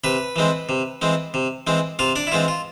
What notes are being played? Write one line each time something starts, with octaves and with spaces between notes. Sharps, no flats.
C3 B4 B5
E3 G#3 C4
C3
E3 G#3 C4
C3
E3 G#3 C4
C3 F4 F5
D4 D5
E4
E3 G#3 C4 F4
F4